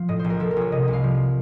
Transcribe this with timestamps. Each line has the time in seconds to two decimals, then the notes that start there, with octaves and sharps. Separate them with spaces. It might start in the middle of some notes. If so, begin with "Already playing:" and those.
Already playing: F3 F5
0.09 A2 D#5
0.19 C5
0.24 A#1
0.30 A#4
0.40 F3 A4
0.51 A#4
0.57 A#1 C#5
0.72 C3 D#5
0.83 D#5
0.88 C2
0.93 F5
1.04 F3